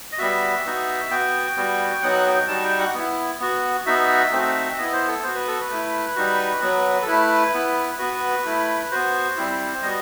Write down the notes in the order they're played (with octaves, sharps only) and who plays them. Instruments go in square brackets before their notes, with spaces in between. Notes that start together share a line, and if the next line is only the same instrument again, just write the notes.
[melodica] D#5
G3 B3 F#4 E5
B3 D#4 F#4
B3 F#4 G5
G3 B3 F#4
F#3 B3 D#4 F#4 F#5
G5
G3 D#4 F#4 A5
G5
F#5
B3 E4
B3 F#4
B3 D#4 F#4 E5
A3 C4 D#4 F#4
B3 E4 D#5
C5
A4
B3 F#4 C5
B4
A4
B4
A3 E4
G3 D#4 F#4
F#3 B3 F#4
A4
A3 E4 B4
B3 E4
B3 F#4 B4
A3 E4
B3 F#4 C5
G3 C4 E4
G3 B3 F#4 D#5